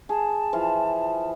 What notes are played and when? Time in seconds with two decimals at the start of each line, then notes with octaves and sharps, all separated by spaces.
0.09 G#4 A5
0.53 E3 F3 F5